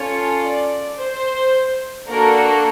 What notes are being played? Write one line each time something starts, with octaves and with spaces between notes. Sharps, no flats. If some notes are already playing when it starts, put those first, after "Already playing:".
Already playing: C#4 F4 A4 C#5
D5
C5
A#3 D4 F#4 A4 A#4